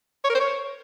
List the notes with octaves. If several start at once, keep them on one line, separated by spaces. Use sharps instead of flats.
C#5
A#4
C5
C#5